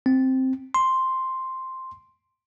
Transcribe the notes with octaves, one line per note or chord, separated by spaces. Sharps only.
C4
C6